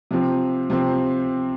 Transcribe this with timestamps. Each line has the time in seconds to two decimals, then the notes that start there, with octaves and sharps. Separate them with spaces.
0.11 C3 F3 C4
0.70 C3 F3 C4